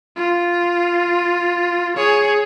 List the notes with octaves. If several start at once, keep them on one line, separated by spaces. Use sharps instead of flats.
F4
G#4 C#5